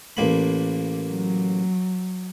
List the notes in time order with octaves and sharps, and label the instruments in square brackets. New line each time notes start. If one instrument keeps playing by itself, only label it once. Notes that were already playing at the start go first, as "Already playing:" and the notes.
[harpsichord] A1 A#3 B5
[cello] F#3